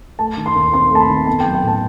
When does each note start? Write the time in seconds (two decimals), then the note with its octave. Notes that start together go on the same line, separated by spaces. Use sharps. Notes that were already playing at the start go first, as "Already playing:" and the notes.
0.19 A3 A5
0.37 D#3
0.46 C6
0.56 D#2
0.73 C4 C6
0.91 A3 A5
1.00 B5
1.10 D#3
1.27 B3 A5
1.40 G5
1.46 F#3
1.54 G5
1.63 A2 A5